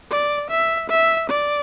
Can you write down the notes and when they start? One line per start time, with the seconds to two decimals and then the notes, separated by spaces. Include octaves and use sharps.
0.11 D5
0.50 E5
0.90 E5
1.30 D5